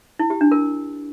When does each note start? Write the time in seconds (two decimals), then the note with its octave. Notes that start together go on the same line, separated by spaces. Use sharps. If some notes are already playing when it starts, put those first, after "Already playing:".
0.19 E4
0.30 G4
0.41 D4
0.52 A#4